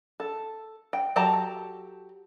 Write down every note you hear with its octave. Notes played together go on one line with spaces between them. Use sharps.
A4
G5
F#3 G4 A4 A5 A#5